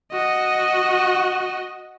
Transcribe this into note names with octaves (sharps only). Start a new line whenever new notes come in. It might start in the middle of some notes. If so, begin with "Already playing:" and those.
F#4 D#5